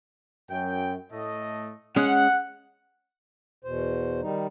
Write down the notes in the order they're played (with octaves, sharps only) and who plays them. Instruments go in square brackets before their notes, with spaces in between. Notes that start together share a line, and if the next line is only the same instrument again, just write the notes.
[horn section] F#2 G5
A2 A3 D#5
[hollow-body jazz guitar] G#3 C#4 [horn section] F#5
[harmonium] E2 B2 C5
D#3 G3 D#4